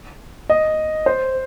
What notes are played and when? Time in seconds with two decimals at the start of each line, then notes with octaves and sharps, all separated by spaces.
0.50 D#5
1.06 C5